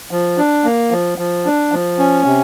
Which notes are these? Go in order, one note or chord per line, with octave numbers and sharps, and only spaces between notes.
F3
D4
A#3
F3
F3
D4
F3
C#4
C3